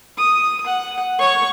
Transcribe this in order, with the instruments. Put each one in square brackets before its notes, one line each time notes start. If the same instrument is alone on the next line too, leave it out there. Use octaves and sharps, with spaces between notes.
[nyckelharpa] D#6
F#5
C#5 C#6